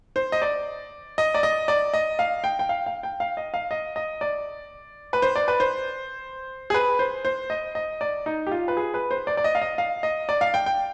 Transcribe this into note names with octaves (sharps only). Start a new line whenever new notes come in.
C5
D#5
D5
D#5
D5
D#5
D5
D#5
F5
G5
G5
F5
F5
G5
F5
D#5
F5
D#5
D#5
D5
B4
C5
D5
B4
C5
G#4
B4
C5
C5
D#5
D#5
D5
D#4
G4
F4
B4
G#4
B4
C5
D5
D5
D#5
F5
D#5
F5
D#5
D5
F5
G5
G5